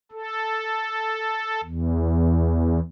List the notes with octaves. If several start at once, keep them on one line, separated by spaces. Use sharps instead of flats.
A4
E2